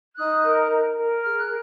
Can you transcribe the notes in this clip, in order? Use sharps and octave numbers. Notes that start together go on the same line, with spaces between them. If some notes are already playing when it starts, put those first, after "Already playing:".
D#4 D#6 F#6
A#4
A#4
A#4
G#4 F6
F#6